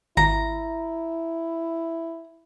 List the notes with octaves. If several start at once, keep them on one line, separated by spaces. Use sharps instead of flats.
G#1 E4 A#5